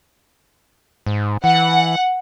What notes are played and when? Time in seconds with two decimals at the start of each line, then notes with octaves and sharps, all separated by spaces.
1.07 G#2
1.44 E3 F#5